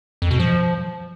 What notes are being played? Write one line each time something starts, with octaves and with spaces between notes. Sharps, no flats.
F2
B2
F3